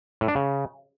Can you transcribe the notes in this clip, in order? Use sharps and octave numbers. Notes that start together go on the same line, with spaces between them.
A2
D4
C#3